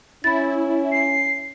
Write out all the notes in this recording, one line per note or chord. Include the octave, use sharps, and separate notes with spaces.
C#4 E4 B5 A6
C7